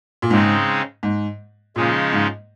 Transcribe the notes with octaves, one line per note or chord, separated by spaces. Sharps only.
A#2
G#2 C#3 G#3 C4 D#4
G#2
A#2 C#3 F3 G#3 D#4
G#2